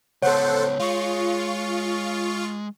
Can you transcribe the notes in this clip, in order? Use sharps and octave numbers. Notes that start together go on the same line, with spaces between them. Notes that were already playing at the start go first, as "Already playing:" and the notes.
C#2 B3 A4 C5 C#5 F#5
G#3 F4 C#6